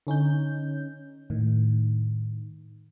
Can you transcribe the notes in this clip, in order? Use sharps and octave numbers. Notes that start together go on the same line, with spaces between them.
D3 C#4 D#4 G6
A2 D#3